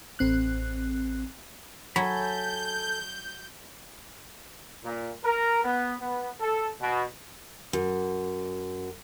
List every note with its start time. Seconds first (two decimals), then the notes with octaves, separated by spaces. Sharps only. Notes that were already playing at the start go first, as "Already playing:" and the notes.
0.19 A1 C4 F#6
1.96 F#3 A4 G#5 B5 G6
4.84 A#2
5.24 A#4
5.64 B3
6.00 B3
6.40 A4
6.80 B2
7.73 F#2